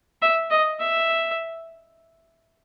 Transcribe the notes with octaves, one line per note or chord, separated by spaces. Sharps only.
E5
D#5
E5